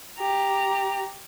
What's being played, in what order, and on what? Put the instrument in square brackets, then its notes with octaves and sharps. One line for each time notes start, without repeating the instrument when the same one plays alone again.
[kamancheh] G4 A#5